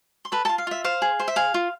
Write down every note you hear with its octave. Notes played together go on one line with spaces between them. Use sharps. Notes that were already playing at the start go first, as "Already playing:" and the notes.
C6
A4 B4 B5
A4 A5
F4
F5
F4 E5
C5 F5
G#4
C5
E5
G#4 F5
F4